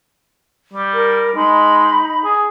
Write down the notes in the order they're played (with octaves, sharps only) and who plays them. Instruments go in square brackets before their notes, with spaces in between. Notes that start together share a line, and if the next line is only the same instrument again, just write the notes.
[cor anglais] G3
[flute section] A#4
[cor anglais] G#3 [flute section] D#4 B5
[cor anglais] G#4